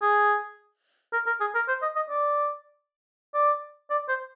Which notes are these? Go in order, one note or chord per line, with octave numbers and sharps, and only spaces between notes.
G#4
A#4
A#4
G#4
A#4
C5
D#5
D#5
D5
D5
D5
C5